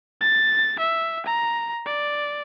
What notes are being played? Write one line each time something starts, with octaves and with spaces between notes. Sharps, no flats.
A6
E5
A#5
D5